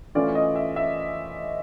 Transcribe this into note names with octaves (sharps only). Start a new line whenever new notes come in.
E3 A3 C#4 F4 D5
D#5
E5
E5